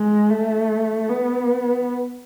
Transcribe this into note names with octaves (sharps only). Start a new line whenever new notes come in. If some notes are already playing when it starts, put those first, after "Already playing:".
Already playing: G#3
A3
B3